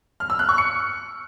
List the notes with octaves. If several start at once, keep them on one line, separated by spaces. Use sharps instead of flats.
F6
E6
F#6
C#6
C#7